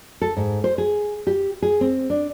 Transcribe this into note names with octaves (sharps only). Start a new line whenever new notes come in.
A4
G#2
C5
G#4
G4
G#4
C4
D4